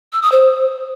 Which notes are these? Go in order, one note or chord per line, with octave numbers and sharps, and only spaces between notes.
E6
D#6
C5